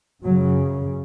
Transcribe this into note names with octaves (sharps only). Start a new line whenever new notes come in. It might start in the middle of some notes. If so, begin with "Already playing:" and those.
F#2 C#3 F#3